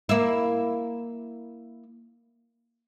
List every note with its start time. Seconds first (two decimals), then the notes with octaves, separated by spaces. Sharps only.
0.09 A#3 E4